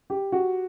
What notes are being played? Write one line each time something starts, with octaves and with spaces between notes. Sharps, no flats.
G4
F#4